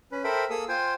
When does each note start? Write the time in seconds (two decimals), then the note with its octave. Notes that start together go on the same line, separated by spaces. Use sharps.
0.12 C#4 B4
0.24 A4 A#4 C5 E5 G5 B5
0.50 A#3 G#4 A4 D#6 E6
0.68 F4 C5 G5 G#5 C6